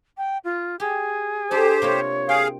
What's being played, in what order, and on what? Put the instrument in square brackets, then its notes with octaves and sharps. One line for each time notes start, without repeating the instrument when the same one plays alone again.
[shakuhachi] G5
F4
[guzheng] G4 [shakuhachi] G#4
[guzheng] D4 A4 [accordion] G4 C5
[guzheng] C3 A#3 F4 [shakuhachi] C#5
[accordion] G#4 F5 [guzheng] G5